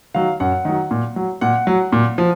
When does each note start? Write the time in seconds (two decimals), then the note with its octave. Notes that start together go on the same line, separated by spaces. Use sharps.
0.14 D#3 F#3 F5
0.40 F#2 F#5
0.65 D#3 F#3
0.91 A#2
1.16 F#3
1.41 A#2 F#5
1.67 F#3
1.92 A#2
2.18 F3